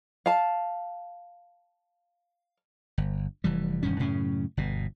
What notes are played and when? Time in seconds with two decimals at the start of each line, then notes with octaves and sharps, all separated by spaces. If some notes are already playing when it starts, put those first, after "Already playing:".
0.26 F5 A5
2.98 G1
3.44 F1 E3 G3
3.83 E1 G2 D#3 C#4
3.99 F#2 A2 C#3 C#4
4.57 G1 B2